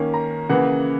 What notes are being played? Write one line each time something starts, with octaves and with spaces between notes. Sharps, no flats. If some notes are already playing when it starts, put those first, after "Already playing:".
Already playing: D#3 A#3 C#4
A#5
C#3 E3 A#3 F#5